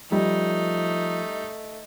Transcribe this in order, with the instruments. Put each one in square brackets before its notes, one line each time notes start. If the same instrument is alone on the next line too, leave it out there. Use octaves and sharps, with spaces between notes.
[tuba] F3 [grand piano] G3 [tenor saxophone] A3 [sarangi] D#4